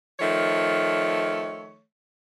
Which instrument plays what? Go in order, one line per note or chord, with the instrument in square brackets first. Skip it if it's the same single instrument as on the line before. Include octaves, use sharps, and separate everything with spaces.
[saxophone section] D#3 F3 A3 C#5